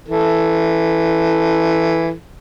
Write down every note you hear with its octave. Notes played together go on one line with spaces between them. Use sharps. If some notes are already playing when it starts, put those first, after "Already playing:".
E3 A4